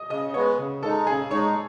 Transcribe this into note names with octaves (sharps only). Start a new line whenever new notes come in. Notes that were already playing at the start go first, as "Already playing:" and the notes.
Already playing: D#5 D#6
C#3 D#5 D#6
G#3 B3 C#5 C#6
C#3
G#3 D#4 A4 A5
C#3 G#4 G#5
G#3 D#4 C#5 C#6